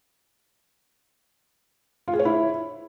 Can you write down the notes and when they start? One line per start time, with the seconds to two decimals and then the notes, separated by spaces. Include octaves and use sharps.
2.08 F4
2.13 G#4
2.19 C#5
2.25 E4